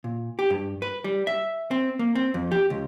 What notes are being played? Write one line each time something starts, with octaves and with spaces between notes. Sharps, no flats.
A#2
G4
G2
B4
G3
E5
C4
A#3
C4
F2
G4
C#2